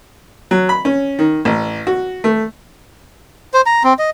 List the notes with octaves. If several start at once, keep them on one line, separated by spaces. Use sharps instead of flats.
F#3
B5
C#4
D#3
A1
F#4
A3
C5
A#5
C4
D#5